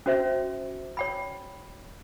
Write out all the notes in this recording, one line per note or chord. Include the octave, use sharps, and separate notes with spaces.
C#4 F#4 C5 E5
C#5 G5 B5